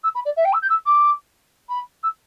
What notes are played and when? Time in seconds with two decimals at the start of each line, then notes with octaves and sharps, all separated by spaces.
0.03 E6
0.15 B5
0.25 D5
0.36 E5
0.45 G5
0.53 E6
0.62 G6
0.70 E6
0.86 D6
1.69 B5
2.03 E6